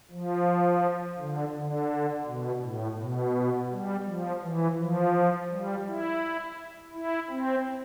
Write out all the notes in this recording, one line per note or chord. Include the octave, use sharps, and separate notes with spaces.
F3
D3
D3
B2
A2
B2
G3
F3
E3
F3
G3
E4
E4
C4